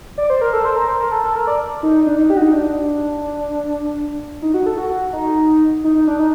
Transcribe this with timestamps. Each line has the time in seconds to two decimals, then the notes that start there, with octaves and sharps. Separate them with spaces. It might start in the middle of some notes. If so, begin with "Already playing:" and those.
0.18 D5
0.30 C5
0.41 A#4
0.53 A4
0.65 C5
0.76 A#4
0.88 C5
1.00 A#4
1.12 A4
1.24 A4
1.35 A#4
1.47 D5
1.83 D#4
2.07 D4
2.18 D#4
2.30 G4
2.37 F#4
2.42 D#4
2.53 D4
4.42 D#4
4.54 F#4
4.66 A4
4.78 F#4
4.90 F#4
5.13 D#4
5.84 D#4
5.95 D#4
6.07 D4
6.19 D#4